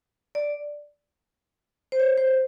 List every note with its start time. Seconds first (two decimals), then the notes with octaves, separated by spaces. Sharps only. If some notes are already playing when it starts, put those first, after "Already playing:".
0.35 D5
1.92 C5
2.00 C#5
2.17 C5